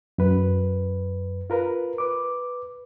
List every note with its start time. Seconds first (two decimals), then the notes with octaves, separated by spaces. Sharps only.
0.18 F#2 B4
1.50 F4 A#4 B4
1.98 B4 D6